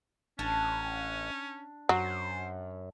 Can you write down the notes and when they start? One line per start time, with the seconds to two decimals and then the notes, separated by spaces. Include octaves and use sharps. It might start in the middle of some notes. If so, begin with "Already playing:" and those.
0.39 A1 C#4 D4
1.89 F#2 F#3 C5